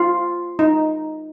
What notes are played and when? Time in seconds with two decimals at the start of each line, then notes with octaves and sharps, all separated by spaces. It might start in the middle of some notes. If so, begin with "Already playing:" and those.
Already playing: F4
0.59 D#4